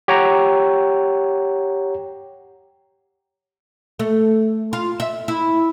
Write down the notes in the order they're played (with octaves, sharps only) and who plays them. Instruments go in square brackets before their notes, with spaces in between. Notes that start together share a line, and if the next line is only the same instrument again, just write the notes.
[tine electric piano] G4 C#5 F#5 G5 A#5
[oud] A3
F4
E5
E4